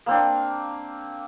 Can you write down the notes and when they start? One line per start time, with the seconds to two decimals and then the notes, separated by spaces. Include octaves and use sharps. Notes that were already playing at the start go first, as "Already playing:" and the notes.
0.06 A#3 C4 D4